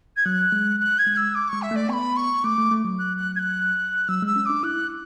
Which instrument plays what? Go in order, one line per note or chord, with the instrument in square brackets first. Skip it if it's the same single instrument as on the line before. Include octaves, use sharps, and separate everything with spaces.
[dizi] G#6
[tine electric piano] F#3 [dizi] F#6
[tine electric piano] G#3
[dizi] F#6
G#6
[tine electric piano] G#3
[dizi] E6
D6
[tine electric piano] G#3 [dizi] C#6
[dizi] E5
[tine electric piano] A3 [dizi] D5
[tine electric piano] B3 [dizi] C#6
[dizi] B5
C#6
[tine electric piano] A3 [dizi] D6
[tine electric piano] A3
A3
F#3
[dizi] F#6
F#6
G#6
F#6
[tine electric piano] F#3 [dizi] E6
[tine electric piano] G#3 [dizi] E6
[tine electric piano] C#4
[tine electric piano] D4 [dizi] D6
[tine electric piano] E4 [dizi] F#6